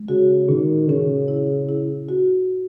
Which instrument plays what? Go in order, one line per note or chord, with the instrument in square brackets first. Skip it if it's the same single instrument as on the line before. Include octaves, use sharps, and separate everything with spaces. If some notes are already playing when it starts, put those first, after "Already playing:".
Already playing: [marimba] G#3
[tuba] C#3 [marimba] F#4
[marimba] A#2 [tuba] D#3
[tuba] C#3 [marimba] C#4
[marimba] E4
E4
F#4